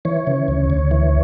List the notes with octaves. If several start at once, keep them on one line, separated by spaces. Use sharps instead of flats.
E3 C#5
C#3
D2
D2
E3